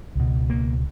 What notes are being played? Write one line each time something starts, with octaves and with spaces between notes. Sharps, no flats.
C#2 B2
A#3